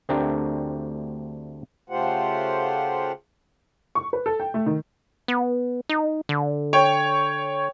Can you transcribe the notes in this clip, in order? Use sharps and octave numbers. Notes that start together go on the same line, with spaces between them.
D2 A3 C4 D4 G4 A#4
C#3 A3 F4 G4 C5 F#5
C#6
B4
A4
G5
A3
D#3
B3
D#4
D3
C#5 G5